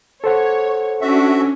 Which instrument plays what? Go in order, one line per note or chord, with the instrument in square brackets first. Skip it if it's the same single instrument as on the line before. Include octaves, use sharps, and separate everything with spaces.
[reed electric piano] A4 C5 F#5 [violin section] C#5
[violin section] C#4 D4 [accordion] F#4 E5